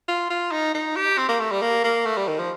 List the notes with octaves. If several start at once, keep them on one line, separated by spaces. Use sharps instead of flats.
F4
F4
D#4
D#4
G4
C4
A#3
A3
G3
A#3
A#3
A3
G3
D#3
F3